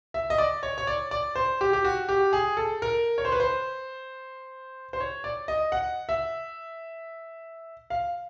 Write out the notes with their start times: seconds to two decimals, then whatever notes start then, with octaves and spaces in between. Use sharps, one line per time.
0.14 E5
0.30 D#5
0.38 D5
0.63 C#5
0.78 C#5
0.87 D5
1.11 D5
1.36 C5
1.61 G4
1.73 G4
1.85 F#4
2.09 G4
2.33 G#4
2.57 A4
2.82 A#4
3.18 C#5
3.25 C5
3.32 B4
3.40 C5
4.93 C5
5.00 C#5
5.24 D5
5.48 D#5
5.72 F#5
6.09 E5
7.90 F5